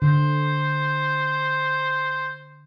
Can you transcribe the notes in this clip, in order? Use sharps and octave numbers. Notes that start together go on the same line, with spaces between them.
D3 C5